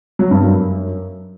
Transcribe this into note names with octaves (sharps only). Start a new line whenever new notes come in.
F#3
G2
F#2